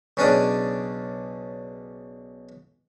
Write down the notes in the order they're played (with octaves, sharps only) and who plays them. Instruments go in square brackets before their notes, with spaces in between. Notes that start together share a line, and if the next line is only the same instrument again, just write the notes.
[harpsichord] B1 C#3 C#4 D4 D5 D#6